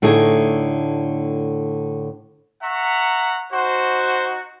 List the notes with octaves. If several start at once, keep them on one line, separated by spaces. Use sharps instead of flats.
A2 D3 A3 D#4 G#4
E5 F#5 A#5 C#6
D#4 F#4 C5